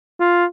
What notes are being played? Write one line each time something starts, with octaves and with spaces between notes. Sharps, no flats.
F4